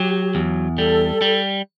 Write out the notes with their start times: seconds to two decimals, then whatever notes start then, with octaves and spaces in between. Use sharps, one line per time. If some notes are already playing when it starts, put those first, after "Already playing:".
Already playing: F#3 G4
0.35 E2
0.78 G3 A4
1.22 G3